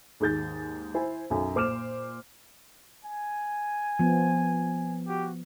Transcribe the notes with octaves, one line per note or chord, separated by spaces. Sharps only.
D#2 G#2 G#4 G6 A6
E4 C5 G#5
B1 F#2
A#2 C5 D6 F6 E7
G#5
F3 B3
F#4 G4